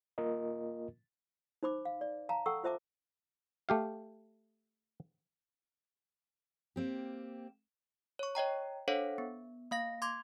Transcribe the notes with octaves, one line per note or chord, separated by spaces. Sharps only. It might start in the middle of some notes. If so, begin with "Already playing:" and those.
A#3 F4 A#4 D#5
D#4 C5 B5 D6
F5
D5
F5 A5 A#5
A4 F#5 G5 A5 C#6 E6
F4 C5 E5 A5 D6
A3 G4 F5
A#3 C4 G4
C#5 C#6
C#5 D#5 G5 A#5
D4 A4 C5 C#5 F5 F#5
B3
A#3 F5 A#6
C6 D6 G#6